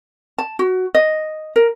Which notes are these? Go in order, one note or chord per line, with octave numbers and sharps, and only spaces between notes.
A5
F#4
D#5
A#4